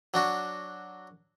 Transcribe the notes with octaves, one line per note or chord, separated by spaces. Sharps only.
F#3 D4 F#4